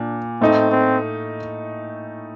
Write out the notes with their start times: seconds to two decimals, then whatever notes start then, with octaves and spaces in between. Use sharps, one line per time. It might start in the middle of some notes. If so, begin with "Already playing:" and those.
Already playing: A#2 D4
0.40 A2 A3 C4 D#4
0.71 C4